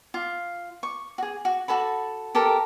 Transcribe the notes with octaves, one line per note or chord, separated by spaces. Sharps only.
F4
C#6
F#4 G#4
F#4
F#4 A4 A5 B5
G4 A4 A#4 A5